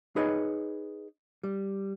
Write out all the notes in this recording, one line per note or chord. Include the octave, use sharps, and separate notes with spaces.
D#4 G#4 B4 C#5 D#5
G3